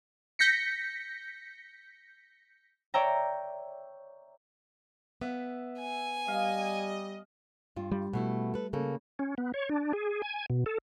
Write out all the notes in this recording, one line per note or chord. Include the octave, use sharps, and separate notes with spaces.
G6 A#6 B6 C#7
C#5 D5 E5 G5 A#5
B3 E5
G#5
G3 D#5 F5
G2 F4
G3
B2 A3 E4
A4 B4
C#3 A#3 A4
C#4
B3
C#5
D4
G#4
G#5
B2
A4